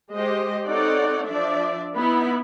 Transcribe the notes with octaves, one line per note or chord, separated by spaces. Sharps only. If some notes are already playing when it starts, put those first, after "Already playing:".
G#3 G4 C5 D#5
C4 D#4 A4 C#5 D5 F#5
F3 D4 D5 E5
B3 D#4 E4 B5